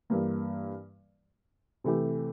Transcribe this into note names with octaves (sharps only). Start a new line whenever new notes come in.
G2 E3 A#3
C3 E3 A3 E4 G4